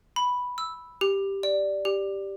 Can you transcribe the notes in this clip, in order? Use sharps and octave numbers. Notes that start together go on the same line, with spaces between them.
B5
E6
G4
D5
G4